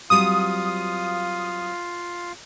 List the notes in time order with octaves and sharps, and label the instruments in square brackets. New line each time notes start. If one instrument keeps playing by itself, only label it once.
[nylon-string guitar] F#3 G3 C4 [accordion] F4 F5 [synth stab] D#6